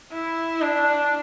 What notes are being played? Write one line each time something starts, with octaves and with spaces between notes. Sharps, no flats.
E4
D4